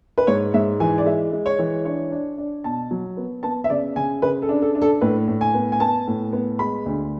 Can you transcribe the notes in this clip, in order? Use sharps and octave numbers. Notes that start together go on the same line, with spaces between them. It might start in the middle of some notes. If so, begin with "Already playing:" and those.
B4
G#2 C#5
G#2 E5
E3 G#5
D5
G#3 E5
G#3
C#5
E3
D4 C#5
D4
D4
B2 A5
F#3
B3
B3 A5
E5
C#3 D5
C#3 G#5
C#3 B4
A4
D4
A4
D4
A4
A2 B4
A2
G#5
B3
G#5
B3 A5
A2
B3
G#3 B5
D2